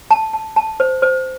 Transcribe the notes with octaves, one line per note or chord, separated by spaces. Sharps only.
A5
A5
A5
C5
C5